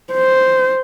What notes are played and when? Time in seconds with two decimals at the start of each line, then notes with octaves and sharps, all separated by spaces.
0.13 C5